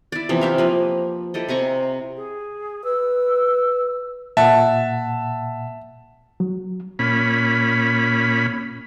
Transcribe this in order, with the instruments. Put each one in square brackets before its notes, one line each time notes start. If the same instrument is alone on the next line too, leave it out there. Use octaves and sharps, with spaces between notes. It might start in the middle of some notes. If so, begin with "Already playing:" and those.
[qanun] E4 D5
C3 E3 F3 B3
G4 E5 F5
F3 A#3 B4
E4 G4 A4 D#5
C3 G#5 A#5 C#6
[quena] G#4
[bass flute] B4 [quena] E6
[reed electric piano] A#2 F#5 [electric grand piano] E5 A5
[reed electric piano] F#3
[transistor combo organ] A#2 C#4 B5